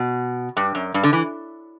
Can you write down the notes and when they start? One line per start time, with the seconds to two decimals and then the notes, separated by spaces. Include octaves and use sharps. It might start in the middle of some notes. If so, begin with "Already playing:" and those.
Already playing: B2
0.57 G2
0.75 F#2
0.94 G2
1.03 D3
1.13 E3